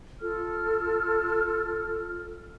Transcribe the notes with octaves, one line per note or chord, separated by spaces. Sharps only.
F4 A4 F6